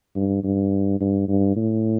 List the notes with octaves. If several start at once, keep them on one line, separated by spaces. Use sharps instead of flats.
G2
G2
G2
G2
A2